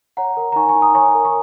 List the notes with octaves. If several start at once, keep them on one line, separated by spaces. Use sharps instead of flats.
C#5 F#5 A#5
A#4
A#5
D#4 G#5 C#6
G#5 C#6
D#4
A#5 D#6
C#5 G#5 C#6
A#4
C#6